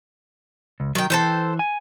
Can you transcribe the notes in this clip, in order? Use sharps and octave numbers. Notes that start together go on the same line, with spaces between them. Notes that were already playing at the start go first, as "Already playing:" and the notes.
C#2
D#3 F#3 G5
E3 A4 C5 G5
G#5